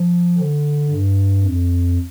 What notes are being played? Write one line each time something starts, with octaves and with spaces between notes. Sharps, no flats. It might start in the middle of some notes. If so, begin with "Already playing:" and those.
Already playing: F3
D3
G2
F2